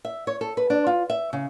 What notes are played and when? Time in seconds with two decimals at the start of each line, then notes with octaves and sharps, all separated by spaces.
0.05 E5
0.27 C#5
0.41 A4
0.57 B4
0.70 D4
0.87 F4
1.10 E5
1.33 C#3